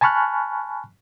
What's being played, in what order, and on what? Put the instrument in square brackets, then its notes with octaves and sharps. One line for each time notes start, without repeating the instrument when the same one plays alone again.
[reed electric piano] G#5 A5 B5 C#6 F6 F#6